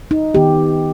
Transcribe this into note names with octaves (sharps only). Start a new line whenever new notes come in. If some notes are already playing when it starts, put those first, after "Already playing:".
D#4
D#3 B3 G4